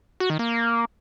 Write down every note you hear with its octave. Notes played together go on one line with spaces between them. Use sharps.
F#4
D#3
A#3